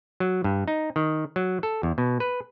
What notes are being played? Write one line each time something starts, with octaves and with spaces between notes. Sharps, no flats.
F#3
G2
D#4
D#3
F#3
A4
E2
B2
B4